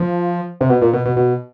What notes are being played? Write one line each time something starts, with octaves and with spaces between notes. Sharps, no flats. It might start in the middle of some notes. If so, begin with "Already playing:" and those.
Already playing: F3
C3
B2
A#2
B2
B2
B2